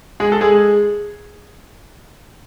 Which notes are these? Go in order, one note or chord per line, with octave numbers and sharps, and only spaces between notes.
G#3 G#4
A4
G#3 G#4